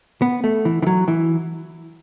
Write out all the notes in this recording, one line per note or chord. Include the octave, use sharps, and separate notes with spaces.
B3
A3
E3
E3
F#3
E3